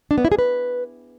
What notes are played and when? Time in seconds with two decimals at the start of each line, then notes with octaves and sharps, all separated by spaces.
0.11 D4
0.18 B3
0.25 E4
0.32 G#4
0.39 B4